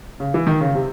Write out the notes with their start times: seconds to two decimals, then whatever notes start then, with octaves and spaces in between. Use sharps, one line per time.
0.20 C#3
0.34 E3
0.47 D#3
0.61 C#3
0.75 C3